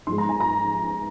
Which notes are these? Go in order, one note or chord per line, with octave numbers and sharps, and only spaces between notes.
G#2 F3 G#3 C6
A#5
G#5
A#5